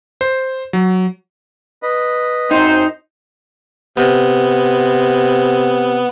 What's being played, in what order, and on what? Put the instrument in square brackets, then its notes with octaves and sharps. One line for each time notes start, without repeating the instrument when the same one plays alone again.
[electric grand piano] C5
F#3
[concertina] B4 D#5
[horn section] F#2 C4 C5 [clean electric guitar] D#4
[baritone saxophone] C3 [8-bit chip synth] B3